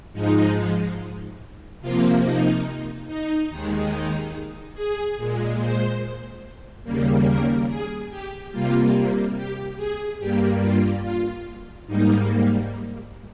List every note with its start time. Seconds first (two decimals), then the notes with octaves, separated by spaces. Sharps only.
0.13 G#2 F3 G#3 D#4
1.81 C3 F3 A#3 F4
2.22 D#4
3.07 D#4
3.49 D#2 D#3 G#3
3.91 D#4
4.74 G#4
5.17 A#2 G#3
5.58 C5
6.84 D#2 C#3 G3 A#3
7.26 A#4
7.69 G#4
8.10 G4
8.52 C3 G3 A#3 F4
9.36 G4
9.77 G#4
10.19 G2 G3 A#3 G4
10.61 F4
11.03 F4
11.86 G#2 G3 A#3 D#4